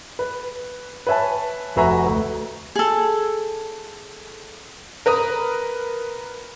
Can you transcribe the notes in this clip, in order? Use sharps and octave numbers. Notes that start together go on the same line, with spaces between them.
B4
B4 C#5 E5 G#5 A5
F1 F#4 B4 E5 G#5 A#5
D2
G#4 A4
A#4 B4 A#5 D#6